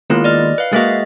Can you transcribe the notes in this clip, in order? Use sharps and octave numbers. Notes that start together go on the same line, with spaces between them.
D#2 G#3 B3 E4 F4 A#4
D5 D#5 F6
B4 F5
G#3 A#3 F#4 D#5 E5 A6